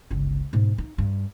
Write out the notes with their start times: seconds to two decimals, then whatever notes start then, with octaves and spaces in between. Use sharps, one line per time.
0.11 G1 C#2
0.53 G#2 B2
0.78 D#4
0.98 G2